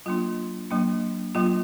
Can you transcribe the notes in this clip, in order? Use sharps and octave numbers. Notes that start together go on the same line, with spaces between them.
F#3 A#3 D4 F4
F#3 A#3 D4
F#3 A#3 D4 F4